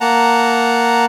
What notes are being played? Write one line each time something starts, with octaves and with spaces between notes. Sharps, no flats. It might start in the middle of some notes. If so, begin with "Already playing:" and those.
A#3 F#5 A5 A#5